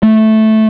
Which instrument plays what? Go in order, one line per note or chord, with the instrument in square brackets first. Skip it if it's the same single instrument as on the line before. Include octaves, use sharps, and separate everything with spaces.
[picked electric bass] A3